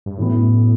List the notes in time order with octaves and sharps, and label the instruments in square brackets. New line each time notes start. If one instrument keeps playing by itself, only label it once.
[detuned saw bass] G2
[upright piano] F#2 E3 B3 [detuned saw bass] A2